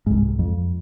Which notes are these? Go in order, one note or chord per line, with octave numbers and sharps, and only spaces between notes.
C2 G#2
F2